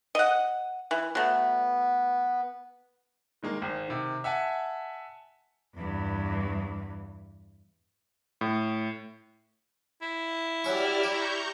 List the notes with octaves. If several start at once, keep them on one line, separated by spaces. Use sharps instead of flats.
D#5 F#5
E3
F#3 A3 B3
D#3 G#3 A#3
G#1
C3 D#3
E5 F#5 G#5 A5
E2 G2
A2
E4
F#3 C#4 G4 D5 C#6 F6
G4 A#5 C#6 G6